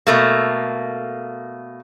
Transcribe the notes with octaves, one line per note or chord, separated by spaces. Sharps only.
B2 A3 A#3